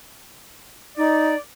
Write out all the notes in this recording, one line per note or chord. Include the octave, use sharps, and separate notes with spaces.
D#4 D5